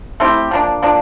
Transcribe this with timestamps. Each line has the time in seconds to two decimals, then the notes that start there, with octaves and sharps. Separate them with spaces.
0.20 A3 C4 E4 G4
0.51 F3 A#3 D4
0.82 F3 A#3 D4